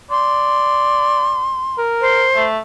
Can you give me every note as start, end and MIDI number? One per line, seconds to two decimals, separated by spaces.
0.11 1.53 74
0.11 1.77 84
1.78 2.26 70
2.01 2.44 72
2.35 2.59 57